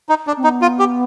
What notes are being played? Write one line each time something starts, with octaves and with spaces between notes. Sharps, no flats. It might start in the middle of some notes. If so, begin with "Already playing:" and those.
D#4
D4
C4
B3 D#4
F4
G4